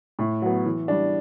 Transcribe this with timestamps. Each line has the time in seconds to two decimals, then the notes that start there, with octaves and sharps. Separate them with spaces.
0.19 A2
0.42 F#3 B3
0.66 E3
0.88 G3 D4